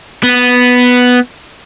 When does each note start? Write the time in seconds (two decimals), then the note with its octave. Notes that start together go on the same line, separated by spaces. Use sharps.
0.24 B3